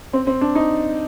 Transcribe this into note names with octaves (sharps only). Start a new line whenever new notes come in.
C4
C4
D4
D#4